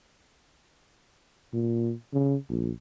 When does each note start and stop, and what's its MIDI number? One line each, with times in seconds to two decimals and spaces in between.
1.53 1.93 46
2.13 2.35 49
2.49 2.70 34